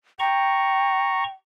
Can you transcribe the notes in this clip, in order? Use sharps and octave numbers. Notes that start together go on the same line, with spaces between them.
G5 A#5 C#6